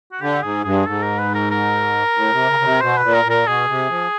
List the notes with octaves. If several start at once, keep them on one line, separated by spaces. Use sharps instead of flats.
F#4
D3 G4
G#2 G#4
G2 G#4
G#2 A4
A#4
B4
A#4
A#4
A2
C3
C#3
C#3
C3
B2 C5
B4
A#2
A#4
A#2
A#4
B2 G#4
C3
F3